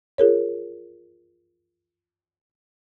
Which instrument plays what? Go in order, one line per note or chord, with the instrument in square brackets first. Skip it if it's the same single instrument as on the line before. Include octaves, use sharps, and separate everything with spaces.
[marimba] F4 G#4 A#4 C#5